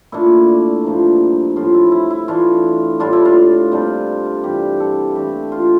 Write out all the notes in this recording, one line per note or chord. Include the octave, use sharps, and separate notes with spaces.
A#2 A3 D4 E4
G2 F3 A#3
A2 F3 C4 F4
E4
E4
E4
E3 A3 D4 F4
A2 G3 D4 F4
E4
F4
C3 G3 D4
G2 E3 G3 G4
A4
E3 A3 D4 G4
F4